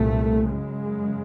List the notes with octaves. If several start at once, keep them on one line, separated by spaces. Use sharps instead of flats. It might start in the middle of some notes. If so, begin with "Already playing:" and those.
Already playing: C2 A#2 A3
F#2 C#3 G#3